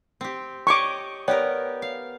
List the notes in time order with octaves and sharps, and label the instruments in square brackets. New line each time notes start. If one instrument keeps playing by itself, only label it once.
[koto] C4 G4
[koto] G4 C#5 D#5 [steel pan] C#6 D6
[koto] B3 G4 A#4 [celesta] C#5 D5 G5
[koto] F5